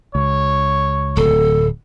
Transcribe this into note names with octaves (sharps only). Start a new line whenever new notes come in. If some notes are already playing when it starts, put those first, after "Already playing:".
C#2 C#5
D1 A4